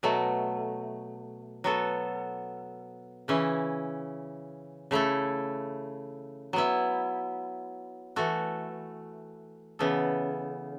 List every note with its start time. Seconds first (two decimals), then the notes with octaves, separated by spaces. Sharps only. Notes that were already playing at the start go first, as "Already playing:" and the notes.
0.03 B2 F#3 A3
1.64 F#3 B3 F#4 A4
3.28 C#3 E3 C#4 E4
4.91 C#3 A3 E4 A4
6.53 F#3 B3 E4
8.16 E3 A3 F#4 A4
9.79 C#3 E3 B3 A4